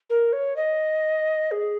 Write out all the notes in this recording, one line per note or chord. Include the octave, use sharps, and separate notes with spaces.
A#4
C#5
D#5
G#4